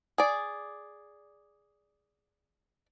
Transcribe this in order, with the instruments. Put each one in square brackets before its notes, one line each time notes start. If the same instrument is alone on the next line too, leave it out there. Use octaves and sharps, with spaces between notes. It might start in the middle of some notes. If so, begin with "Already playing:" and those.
[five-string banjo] G#4 D5